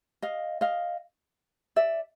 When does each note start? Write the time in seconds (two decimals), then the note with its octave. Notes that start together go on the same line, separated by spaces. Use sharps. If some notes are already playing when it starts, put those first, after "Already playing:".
0.22 D#5 F5
0.61 D#5 F5
1.76 D5 E5